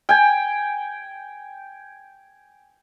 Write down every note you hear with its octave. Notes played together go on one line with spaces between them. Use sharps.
G5 G#5